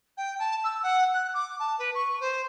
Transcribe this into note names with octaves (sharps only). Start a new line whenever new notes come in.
G5
A5
E6
F#5
F#6
D6
A5
B4
C#6
C5